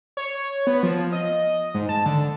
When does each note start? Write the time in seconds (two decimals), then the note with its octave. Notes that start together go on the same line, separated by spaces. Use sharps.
0.17 C#5
0.67 B3
0.83 F3
1.12 D#5
1.74 G#2
1.89 A5
2.06 D3